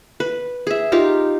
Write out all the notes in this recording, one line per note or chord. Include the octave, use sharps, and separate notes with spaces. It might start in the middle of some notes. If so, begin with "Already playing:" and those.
B4
G#4 E5
D#4 F4 G4 A#4